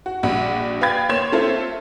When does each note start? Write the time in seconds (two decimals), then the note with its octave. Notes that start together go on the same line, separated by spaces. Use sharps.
0.06 F#4
0.23 A#1 G2 F#4
0.81 B4 F5 G5 B5 G#6 A6
1.09 A#3 C#5 C6 G#6 E7
1.32 A3 C4 F4 A4 C5 E5